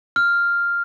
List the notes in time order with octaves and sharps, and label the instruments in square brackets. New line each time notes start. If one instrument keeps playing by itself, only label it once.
[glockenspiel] F6